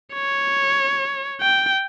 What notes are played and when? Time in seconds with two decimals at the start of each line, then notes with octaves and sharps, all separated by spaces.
0.14 C#5
1.41 G5